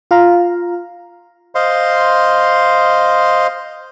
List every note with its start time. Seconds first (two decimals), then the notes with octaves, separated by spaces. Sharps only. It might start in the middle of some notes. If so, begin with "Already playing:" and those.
0.11 F4 F5 A#5
1.55 C5 D#5 F5 C6